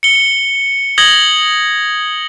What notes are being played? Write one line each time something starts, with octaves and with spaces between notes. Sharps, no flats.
C#7 G7
D#6 G#6 A#6 F#7 G7